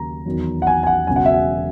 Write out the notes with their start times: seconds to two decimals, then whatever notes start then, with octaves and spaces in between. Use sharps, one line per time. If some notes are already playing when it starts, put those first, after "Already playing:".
Already playing: D#2 C#3 F#3 A#5
0.25 E2 D#3 F#3
0.62 F#5
0.67 G#5
0.83 G#5
0.87 F#5
1.07 E1 E2 C#3 F#3 G#5
1.16 F#5
1.26 E5
1.34 F#5